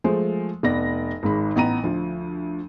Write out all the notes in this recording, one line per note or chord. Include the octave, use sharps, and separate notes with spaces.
F3 G#3 A3 C5
F1 B3 D5 A#6
G#1 G#2 B5
A1 B3 A#5 D#7
D2 F3